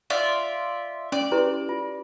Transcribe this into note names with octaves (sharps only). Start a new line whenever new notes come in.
F4 D5 E5
C#4 D5
E4 G4 B4
F4